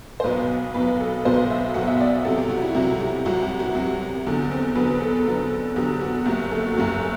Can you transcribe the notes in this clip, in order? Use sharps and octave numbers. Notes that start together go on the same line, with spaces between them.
C5
B1 B2 F#3 B4
B1 B2 F#3 B4
A4
B1 B2 F#3 C5
E5
B1 B2 F#3 F#5
E5
D5
C2 C3 F#3 A4
G4
F#4
E4
C2 C3 F#3 F#4
G4
C2 C3 F#3 F#4
G4
F#4
C2 C3 F#3
E2 D3 F#3
C4
E2 D3 F#3 B4
A4
E2 D3 F#3
E2 D3 F#3 G4
F#4
F#1 F#2 F#3 G4
A4
F#4
F#1 F#2 F#3 G4